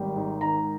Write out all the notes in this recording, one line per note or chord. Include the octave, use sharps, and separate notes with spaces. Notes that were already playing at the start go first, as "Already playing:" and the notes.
Already playing: G#1 G3
G#2
D#3 A#5